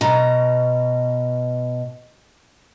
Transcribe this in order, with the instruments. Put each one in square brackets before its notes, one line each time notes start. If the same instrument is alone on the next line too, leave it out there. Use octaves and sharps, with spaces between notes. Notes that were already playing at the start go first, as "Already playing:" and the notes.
[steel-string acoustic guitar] B2 A#5